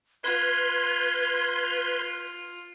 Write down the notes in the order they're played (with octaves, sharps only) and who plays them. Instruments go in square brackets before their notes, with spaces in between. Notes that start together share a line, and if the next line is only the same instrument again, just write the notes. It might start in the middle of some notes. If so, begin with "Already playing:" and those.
[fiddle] F4 [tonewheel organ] B4 C6 [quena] G#6